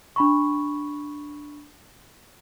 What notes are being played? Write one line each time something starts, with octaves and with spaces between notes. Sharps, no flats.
D4 B5 C#6